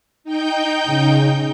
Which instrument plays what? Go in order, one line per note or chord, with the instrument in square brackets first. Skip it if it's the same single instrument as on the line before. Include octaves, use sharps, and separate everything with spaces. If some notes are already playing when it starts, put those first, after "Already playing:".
[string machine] D#4 G5 G6
[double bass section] C#3